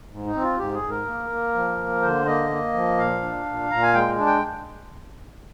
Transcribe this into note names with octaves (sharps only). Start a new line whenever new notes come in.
G#2
D#4
C4
F4
G#2 G4
G#4
G#2
A#4
A#3
A#3
F3
A#3
D3 C5
A#3 D#5
A#3
F3
A#2 F5
D4
A#2
A#2 A#5
G#5
G#3 G5
D4
G5